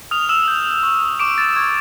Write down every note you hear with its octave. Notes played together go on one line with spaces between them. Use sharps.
D#6 F6 F7
E6 E7
G6
C#6
C#6 D6 D7
A6
C#6 G#6